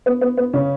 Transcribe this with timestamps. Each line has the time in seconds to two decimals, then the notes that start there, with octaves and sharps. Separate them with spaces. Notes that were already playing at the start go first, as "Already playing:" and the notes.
0.06 B3
0.21 B3
0.37 B3
0.53 C#3 C#4